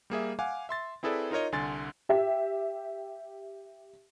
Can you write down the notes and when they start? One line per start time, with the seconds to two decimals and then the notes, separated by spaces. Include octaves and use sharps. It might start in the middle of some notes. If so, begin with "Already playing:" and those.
0.10 G3 A#3 G#4 E5
0.39 F5 F#5 G#5 D6
0.69 E5 C6 A6
1.03 C4 E4 G#4 A4 B4 D5
1.31 D#4 F4 A#4 C#5 D#5
1.52 C2 D3 G#5 C6 A6
2.09 G4 E5